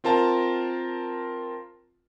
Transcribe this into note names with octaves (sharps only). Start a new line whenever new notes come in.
C4 F4 A#4 A5 A#5